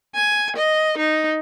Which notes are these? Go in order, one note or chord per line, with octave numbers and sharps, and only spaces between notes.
G#5
D#5
D#4